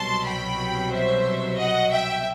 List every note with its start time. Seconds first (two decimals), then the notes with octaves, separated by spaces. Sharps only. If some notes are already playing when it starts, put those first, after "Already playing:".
Already playing: C2 B2 F#3 A5 C6
0.27 G5 B5
0.92 C5 E5
1.58 D#5 F#5
1.91 E5 G5